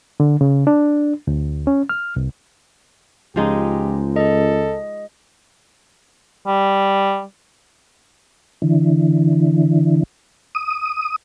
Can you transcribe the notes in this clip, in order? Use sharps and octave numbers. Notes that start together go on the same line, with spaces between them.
D3
C#3
D4
D2
C#4
F6
C2
C#2 F3 G#3 D#4 G4
A4 D#5
G3
D3 E3
D#6